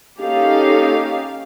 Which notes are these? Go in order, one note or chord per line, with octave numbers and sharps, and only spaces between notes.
A#3 C#4 D#4 G4 A4 F5